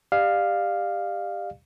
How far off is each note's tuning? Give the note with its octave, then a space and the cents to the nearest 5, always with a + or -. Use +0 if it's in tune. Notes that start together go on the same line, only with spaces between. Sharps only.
G4 +20 D5 +35 F5 +0